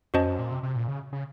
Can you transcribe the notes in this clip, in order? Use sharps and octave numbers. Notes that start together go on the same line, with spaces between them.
F2 C#4 F#4 C5 D#5 A5
F#2
A#2
C3
C3
A#2
C#3
C#3